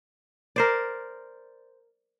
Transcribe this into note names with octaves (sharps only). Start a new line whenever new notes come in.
A#4 C5 D5